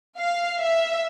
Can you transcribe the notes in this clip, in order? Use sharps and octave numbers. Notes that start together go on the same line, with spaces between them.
F5
E5